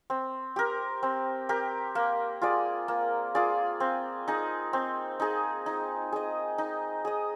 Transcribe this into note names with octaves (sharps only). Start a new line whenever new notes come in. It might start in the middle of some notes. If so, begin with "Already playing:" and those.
C4
G4 A#4
C4
G4 A#4
A#3
F4 G#4 D5
A#3
F4 G#4 D5
C4
D#4 G#4
C4
D#4 G#4
D#4
G#4 D#5
D#4
G#4 D#5